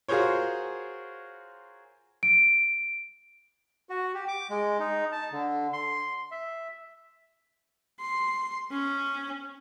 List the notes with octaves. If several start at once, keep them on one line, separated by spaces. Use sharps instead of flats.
F4 F#4 G#4 A#4 C5 C#5
D7
F#4
G4
D6
G#3
D#4
A5
D3
C6
E5
C6
C#4